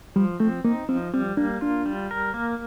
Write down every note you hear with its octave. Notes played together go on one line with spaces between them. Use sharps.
F3 G3
A3 C4
A#3 D#4
F3 C4
G3 C4
A#3 D4
D4 F4
G3
A#4
A#3